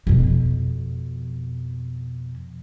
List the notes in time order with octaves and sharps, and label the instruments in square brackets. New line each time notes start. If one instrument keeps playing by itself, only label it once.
[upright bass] F2 B2